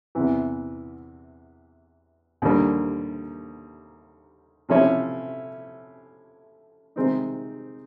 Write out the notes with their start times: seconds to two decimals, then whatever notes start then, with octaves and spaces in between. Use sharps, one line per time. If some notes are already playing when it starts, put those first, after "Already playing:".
0.15 E2 C3 E3
2.42 D#2 D3 G3 A#3
4.69 C3 F3 A3 C#4 E4
6.96 C3 D#3 G#3 C4 D#4